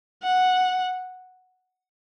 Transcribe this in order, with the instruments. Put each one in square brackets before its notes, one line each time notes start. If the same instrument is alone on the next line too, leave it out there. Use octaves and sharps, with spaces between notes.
[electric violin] F#5